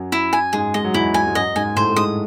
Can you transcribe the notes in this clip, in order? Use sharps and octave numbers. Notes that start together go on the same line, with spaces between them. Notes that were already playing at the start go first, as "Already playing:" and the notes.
Already playing: F#2 F#3
E4
G#5
G#2 G#3 G#4
G#3 D#5
F#3
E2 E3 E4
G#5
G#3
F#2 F#3 D#5
G#2 G#3 G#5
A2 A3 C5
A3
G#2 G#3 D#6